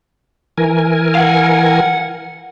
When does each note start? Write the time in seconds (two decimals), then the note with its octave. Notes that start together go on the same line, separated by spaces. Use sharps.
0.58 E3 A#4 G#5
1.15 F5 F#5